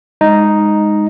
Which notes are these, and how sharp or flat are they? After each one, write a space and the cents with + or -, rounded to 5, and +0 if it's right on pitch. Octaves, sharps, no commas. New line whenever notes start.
G#3 -10 D#4 +0